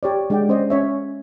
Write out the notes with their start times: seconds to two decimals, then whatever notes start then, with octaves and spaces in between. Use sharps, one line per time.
0.03 G4 C#5 D5
0.30 G#3 D4 G4 D5 F#5 G5
0.49 C#4 C5 D5 D#5
0.70 C#4 C#5 E5